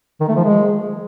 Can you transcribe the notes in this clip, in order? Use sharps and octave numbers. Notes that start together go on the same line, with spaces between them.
D#3
A3
F3
G#3